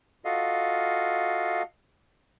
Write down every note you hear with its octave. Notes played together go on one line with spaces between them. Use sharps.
F4 F#4 A4 D#5 F5